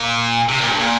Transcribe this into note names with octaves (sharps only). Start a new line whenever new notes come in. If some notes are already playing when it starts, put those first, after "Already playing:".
Already playing: A#2
C3
A#2
G2
A#2